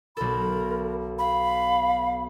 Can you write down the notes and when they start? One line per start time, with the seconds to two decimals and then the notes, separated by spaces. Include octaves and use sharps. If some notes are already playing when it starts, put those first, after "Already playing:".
0.17 B1 A4 A#4 B5
1.19 F5 B5